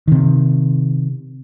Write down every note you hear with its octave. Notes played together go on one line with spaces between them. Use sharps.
C3 D#3